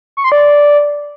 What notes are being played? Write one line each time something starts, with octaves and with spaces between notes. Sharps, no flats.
C#6
C6
D5